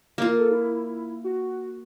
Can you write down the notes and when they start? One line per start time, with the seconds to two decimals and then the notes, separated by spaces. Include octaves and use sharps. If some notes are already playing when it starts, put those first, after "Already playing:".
0.18 A#3 F4
0.38 A4
0.51 E4
1.24 F#4